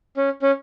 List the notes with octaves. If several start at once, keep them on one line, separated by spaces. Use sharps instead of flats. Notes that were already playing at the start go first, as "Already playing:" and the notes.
C#4
C#4